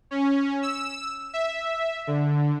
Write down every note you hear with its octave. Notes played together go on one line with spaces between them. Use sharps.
C#4
E6
E5
D3